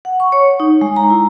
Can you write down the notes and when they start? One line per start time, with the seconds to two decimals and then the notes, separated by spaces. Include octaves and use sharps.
0.05 F#5
0.20 C#6
0.32 C#5
0.60 D#4
0.81 G#3
0.96 A#5
1.10 E4